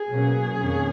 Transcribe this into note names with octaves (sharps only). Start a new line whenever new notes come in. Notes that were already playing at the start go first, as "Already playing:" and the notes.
Already playing: G#4
B2 F#3 A#3 C#4
F2 D#3 A#3 C#4